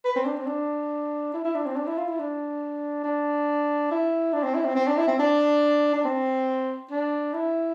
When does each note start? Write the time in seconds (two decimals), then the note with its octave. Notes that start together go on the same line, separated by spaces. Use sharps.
0.05 B4
0.16 C4
0.26 D4
0.37 C4
0.47 D4
1.34 E4
1.45 E4
1.55 D4
1.66 C4
1.76 D4
1.87 E4
1.98 F4
2.08 E4
2.19 D4
3.04 D4
3.91 E4
4.33 D4
4.44 C4
4.55 E4
4.65 C4
4.76 C4
4.88 D4
4.98 E4
5.08 C4
5.19 D4
5.94 D4
6.05 C4
6.91 D4
7.34 E4